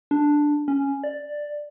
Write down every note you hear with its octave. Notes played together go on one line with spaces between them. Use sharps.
D4
C#4
D5